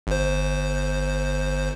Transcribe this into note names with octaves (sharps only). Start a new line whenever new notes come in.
G1 C5